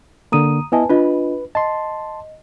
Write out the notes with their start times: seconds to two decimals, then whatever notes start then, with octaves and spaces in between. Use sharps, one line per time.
0.32 D3 A#3 A#5 D#6 D#7
0.72 B3 E4 B4 D#5 G#5 A5
0.89 D4 F4 B4 D#5
1.55 D#5 A5 C6